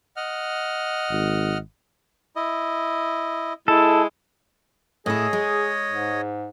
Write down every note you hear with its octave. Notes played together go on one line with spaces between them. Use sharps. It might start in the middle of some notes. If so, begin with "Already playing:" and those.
D#5 F#5 F6
G#1
E4 D#5
G#3 E4 A4
A2 E4 G#4 C#5 D#5
G#3
G#2